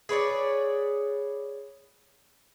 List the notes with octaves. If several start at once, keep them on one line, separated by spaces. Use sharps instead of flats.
G#4 B4 C#5 D5